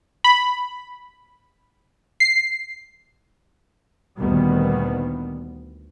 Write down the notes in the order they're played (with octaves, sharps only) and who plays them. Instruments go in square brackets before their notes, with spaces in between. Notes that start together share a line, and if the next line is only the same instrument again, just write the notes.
[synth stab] B5
C7
[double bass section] D2 A#2 D#3 G3 B3